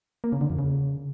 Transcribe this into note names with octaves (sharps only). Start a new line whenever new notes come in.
A#3
C#3
D3
F2
C#3